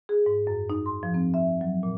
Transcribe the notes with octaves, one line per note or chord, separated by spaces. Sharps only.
G#4
G#2
F#2
D#4
C6
F3
C4
E5
F#3
A#2